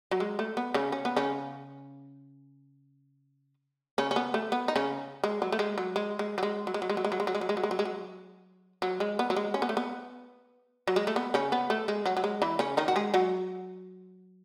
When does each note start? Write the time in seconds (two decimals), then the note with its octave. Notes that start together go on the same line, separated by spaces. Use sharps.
0.11 F#3
0.20 G#3
0.39 A3
0.57 B3
0.74 C#3 C#4
0.92 C#4
1.05 B3
1.16 C#3 C#4
3.98 C#3 C#4
4.11 C#4
4.16 B3
4.34 A3
4.52 B3
4.68 D#4
4.76 C#3 C#4
5.24 G#3
5.42 F#3
5.52 A3
5.59 G#3
5.78 F#3
5.96 G#3
6.19 G#3
6.38 F#3
6.43 G#3
6.67 F#3
6.74 G#3
6.82 F#3
6.90 G#3
6.97 F#3
7.05 G#3
7.12 F#3
7.20 G#3
7.27 F#3
7.35 G#3
7.41 F#3
7.49 G#3
7.57 F#3
7.63 G#3
7.71 F#3
7.79 G#3
7.85 F#3
8.82 F#3
9.00 G#3
9.19 B3
9.30 F#3
9.36 G#3
9.54 C#4
9.62 B3
9.69 A3
9.77 B3
10.87 F#3
10.96 G#3
11.07 A3
11.16 B3
11.34 C#3 C#4
11.52 B3
11.70 A3
11.88 G#3
12.06 F#3
12.17 F#3
12.24 G#3
12.42 E3 E4
12.59 C#3 C#4
12.77 D#3 D#4
12.88 F#4
12.96 G#3 G#4
13.14 F#3 F#4